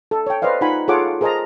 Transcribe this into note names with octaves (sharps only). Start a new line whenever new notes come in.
A4
C#5 G5
B4 C5 D5 D#5 F5
D#4 F4 F#5 G#5 B5
F4 G#4 A4 C#5 F#5 D6
G#4 A#4 C5 D#5 A5 A#5